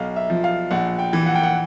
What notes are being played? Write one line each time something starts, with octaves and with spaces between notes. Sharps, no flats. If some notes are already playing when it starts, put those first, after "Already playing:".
Already playing: B1 F5
E5
F3
F5
A#1 F#5
G5
E3
F#5
G5
F#5